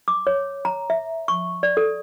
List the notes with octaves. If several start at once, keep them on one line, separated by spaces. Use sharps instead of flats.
D6
C#5
A#5
E5
C#6
D5
A4